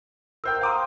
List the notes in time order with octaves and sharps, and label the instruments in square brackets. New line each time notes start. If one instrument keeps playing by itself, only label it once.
[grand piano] A#4 C5 G5 [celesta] E6
[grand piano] F5 D6 D#6 [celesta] G5 A#5 C6